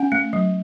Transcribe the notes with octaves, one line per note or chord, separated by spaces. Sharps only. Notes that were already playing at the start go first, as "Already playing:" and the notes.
Already playing: C#4 F#5
A3
F#3